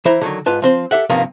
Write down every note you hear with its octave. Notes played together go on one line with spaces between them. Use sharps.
E3 E4 C5 A#5
D3 D#3 F#3
G#2 F4 B4 A5
F3 C4 C5
G4 A4 E5 F#5
G2 C3 D#3 F3 A#3 B3